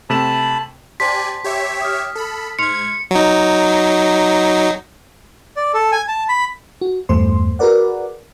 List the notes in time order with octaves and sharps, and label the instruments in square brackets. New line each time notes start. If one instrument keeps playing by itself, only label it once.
[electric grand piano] C3 A3 E7 [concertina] A5 B5
[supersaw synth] G4 D5 G#5 [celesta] C5 A5 C6 [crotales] B6
[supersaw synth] G4 C#5 E5
[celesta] D#6 F6
[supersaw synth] A4 B5
[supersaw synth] G#2 G#6 [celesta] C6 F6 F7 [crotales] C#7
[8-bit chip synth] F#3 D#4
[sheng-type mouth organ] D5
A4
G#5
A5
B5
[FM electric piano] F#4
E2 G2 A3 C5 C6
F#4 G#4 A#4 B4 D5 F#5